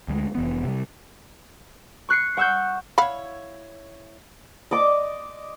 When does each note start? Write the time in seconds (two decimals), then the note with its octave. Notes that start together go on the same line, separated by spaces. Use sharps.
0.08 D2 G3 G#3
0.35 F1 E3 B3
0.64 C3 G3
2.09 C#6 F#6 C7 C#7
2.37 F#5 C#6 E6 F#6 G6
2.98 E4 C#5 F5 F#5 B5
4.71 D5 D#5 D6